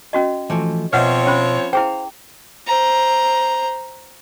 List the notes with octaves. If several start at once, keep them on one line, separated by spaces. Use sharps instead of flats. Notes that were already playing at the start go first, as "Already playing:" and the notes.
C#4 F#4 D#5
E3 F3 A3
B2 F3 C4 B4 C#5 E5 F#5
C#4 C5 B5
E4 G#4 C5 F5 G5
C5 A#5